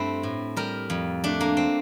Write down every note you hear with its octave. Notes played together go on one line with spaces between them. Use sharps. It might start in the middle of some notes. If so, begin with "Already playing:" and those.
Already playing: G2 A3 C4 E4
A2
G3 A#4
F2
A3 D4
A#3
C4